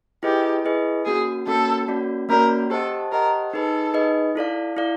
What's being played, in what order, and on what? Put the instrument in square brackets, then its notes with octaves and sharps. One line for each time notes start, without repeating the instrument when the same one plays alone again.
[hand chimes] E4 G#4 B4 D#5 [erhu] G4
[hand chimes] E4 G#4 B4 D#5
[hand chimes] A#3 C#4 F#4 [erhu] G#4
[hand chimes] A#3 C#4 F#4 [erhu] A4
[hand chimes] A#3 C#4 F#4 A4 D5
[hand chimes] A#3 C#4 F#4 A4 D5 [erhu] A#4
[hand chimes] G4 C5 D#5 F#5 A5 [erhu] A4
[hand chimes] G4 C5 D#5 F#5 A5 [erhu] A#4
[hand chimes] D#4 G#4 B4 D#5 [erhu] A4
[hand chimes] D#4 G#4 B4 D#5
E4 A4 D5 F5
E4 A4 D5 F5